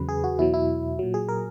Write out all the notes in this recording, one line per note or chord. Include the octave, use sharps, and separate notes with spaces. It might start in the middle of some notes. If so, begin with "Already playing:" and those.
Already playing: E2 C#3 F#3 B4
G#4
F#4
E2 B2 F#3 E4
E4
A#2 F#3
G#4
A#4